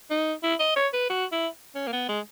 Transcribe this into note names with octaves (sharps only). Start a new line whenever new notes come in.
D#4
E4
D#5
C#5
B4
F#4
E4
C#4
A#3
B3
G#3